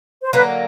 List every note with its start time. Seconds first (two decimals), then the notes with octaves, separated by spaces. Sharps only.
0.23 C5
0.33 D3 F#3 A#3 B4